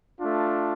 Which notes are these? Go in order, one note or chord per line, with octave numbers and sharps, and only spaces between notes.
A3 D4 F4